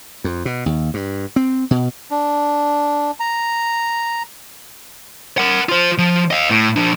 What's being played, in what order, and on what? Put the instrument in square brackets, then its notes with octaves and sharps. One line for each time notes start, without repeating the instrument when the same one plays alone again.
[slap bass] F2
B2
D#2
G2
C4
B2
[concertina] D4
A#5
[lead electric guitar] A#4 F#5
F4 C5
F3
D#5 F5
A2
F3 D4